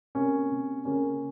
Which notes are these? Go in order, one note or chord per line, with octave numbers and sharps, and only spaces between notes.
C3 A#3 C#4
C3
C#3 A#3 C#4